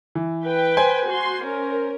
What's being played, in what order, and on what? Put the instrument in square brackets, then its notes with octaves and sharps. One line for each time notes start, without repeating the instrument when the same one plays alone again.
[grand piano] E3
[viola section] B4 G5
[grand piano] C5 G#5
[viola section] F#4 C6
C#4 A#4